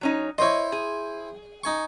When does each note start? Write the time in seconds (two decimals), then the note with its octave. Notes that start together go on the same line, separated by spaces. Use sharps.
0.01 F#3 C#4 D#4
0.38 E4 C5 C#5 D#5 C6
0.72 G#4
1.64 D#4 G#5 C#6